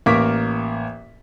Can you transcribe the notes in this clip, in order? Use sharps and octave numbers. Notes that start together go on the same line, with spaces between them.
A1 A#3 A#4 C#6 D6 B6